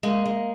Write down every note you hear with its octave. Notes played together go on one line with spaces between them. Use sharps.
G#3 A#3
G#3